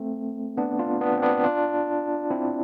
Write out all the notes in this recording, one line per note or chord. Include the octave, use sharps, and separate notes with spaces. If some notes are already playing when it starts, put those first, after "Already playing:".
Already playing: A3 C4
B3 D4
D4 F4
B3 D4
C4
B3 D4
D4 F4
C4 E4